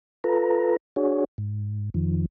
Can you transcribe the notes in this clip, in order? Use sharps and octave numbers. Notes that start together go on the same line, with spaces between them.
F4 A4 B4 A#5
D4 F#4 G#4 C#5
G#2
F2 D#3 F3